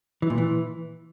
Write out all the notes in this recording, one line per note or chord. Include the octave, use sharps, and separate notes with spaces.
E3
A#2
E3